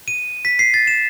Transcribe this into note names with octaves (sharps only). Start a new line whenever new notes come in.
D#7
B6
C7
A6
E7